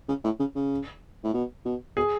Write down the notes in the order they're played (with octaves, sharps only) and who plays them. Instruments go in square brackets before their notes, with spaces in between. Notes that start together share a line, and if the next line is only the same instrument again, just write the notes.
[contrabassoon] C#3
A2
C#3
C#3
A2
B2
B2
[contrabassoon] B2 [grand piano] G#4